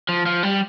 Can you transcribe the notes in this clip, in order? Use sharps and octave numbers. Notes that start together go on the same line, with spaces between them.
F3
F3
G3